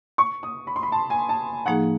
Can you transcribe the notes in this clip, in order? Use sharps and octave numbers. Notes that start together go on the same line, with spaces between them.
C#6
D#6
B5
C6
B5
A5
G#5
A5
A2 F3 A#3 D#4 G#4 F#5